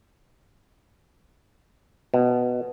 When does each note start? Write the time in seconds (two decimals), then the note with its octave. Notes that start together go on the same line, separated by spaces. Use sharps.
2.14 B2